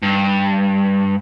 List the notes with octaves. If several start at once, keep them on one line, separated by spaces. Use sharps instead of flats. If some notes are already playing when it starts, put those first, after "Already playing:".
G2